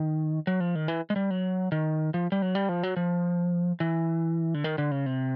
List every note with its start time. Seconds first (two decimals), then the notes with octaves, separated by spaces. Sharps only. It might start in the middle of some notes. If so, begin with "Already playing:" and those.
Already playing: D#3
0.47 F#3
0.60 F3
0.75 D#3
0.88 E3
1.10 G#3
1.16 G3
1.30 F#3
1.72 D#3
2.14 F3
2.32 G3
2.42 F#3
2.55 G3
2.69 F3
2.83 F#3
2.97 F3
3.80 E3
4.54 D3
4.64 D#3
4.78 D3
4.91 C#3
5.06 C3